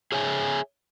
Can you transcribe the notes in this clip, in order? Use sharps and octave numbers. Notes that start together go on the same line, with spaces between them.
G#4 C#5 E5 G#5